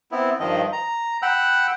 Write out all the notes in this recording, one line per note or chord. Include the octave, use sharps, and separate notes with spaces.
B3 C4 E4
G2 D#3 F3 D#5
A#5
F#5 G5 B5 E6 F#6